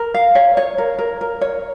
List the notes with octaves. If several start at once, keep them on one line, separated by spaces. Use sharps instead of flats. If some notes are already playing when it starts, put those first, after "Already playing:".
Already playing: A#4
F5
C#5
C#5
A#4
A#4
A#4
C#5